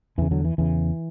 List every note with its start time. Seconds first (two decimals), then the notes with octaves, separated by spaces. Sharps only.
0.18 E2 C#3 E3
0.31 D3 F#3
0.45 E3
0.58 E2 C#3 E3